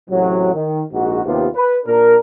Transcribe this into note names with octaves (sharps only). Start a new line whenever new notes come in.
A1 C3 F#3
D#3
A#1 G#2 F#4
D#2 C3 B3 F4 G4
B4
A#2 D4 A#4